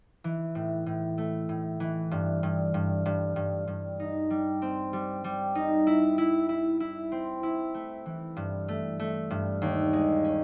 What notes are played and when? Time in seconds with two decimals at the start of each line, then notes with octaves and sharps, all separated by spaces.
0.24 E3
0.55 A2
0.86 A2
1.18 A3
1.49 A2
1.80 E3
2.11 G2
2.43 G2
2.74 G2
3.06 G2
3.36 G2
3.68 G2
4.00 D#4
4.30 G3
4.62 C4
4.93 G3
5.24 G3
5.55 D#4
5.87 E4
6.18 E4
6.49 E4
6.80 E4
7.12 C4
7.43 E4
7.74 A3
8.06 E3
8.37 G2
8.68 A3
9.00 A3
9.30 G2
9.62 D#2
9.93 G#3
10.24 C#4